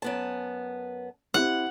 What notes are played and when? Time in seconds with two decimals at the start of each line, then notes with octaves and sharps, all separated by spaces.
0.02 F#2 B3 A5
1.34 C4 E4 G4 F#5